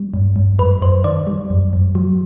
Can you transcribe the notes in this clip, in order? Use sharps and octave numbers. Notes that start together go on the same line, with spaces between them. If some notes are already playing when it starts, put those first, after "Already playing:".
Already playing: G3
G2
G2
F#2 B4
F#2 C5
D#3 D5
G3
F#2
F#2
F#3